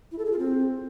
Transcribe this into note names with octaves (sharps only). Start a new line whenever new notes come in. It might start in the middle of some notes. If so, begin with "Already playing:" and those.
E4
A4
G#4
F4
C4